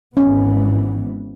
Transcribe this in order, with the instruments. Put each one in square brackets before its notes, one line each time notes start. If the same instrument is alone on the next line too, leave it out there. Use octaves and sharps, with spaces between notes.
[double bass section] G#1 G#2 E3 B3 [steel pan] C#4